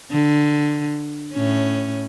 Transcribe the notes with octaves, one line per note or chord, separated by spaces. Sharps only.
D3
A2 C#4